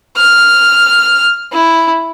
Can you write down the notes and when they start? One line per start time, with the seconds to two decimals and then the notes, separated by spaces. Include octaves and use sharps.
0.17 F6
1.53 E4